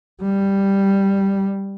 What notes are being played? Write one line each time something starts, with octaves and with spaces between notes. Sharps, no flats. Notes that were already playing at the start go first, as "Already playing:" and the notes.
G3